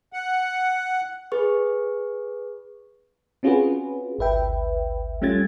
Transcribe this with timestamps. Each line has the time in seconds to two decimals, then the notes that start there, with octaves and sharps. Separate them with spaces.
0.13 F#5
1.32 G#4 B4 C#6
3.43 C4 C#4 F4 F#4 G#4 B4
4.19 G#1 D2 B4 E5 G5
5.22 G3 A3 C#4 F4 G#6 A6